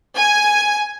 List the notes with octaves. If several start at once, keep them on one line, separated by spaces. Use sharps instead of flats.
G#5